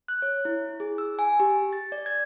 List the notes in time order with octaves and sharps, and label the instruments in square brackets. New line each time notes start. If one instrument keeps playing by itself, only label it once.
[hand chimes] F#6
C#5
E4
G#4
E6
G#5
G4
A6
D5
G#6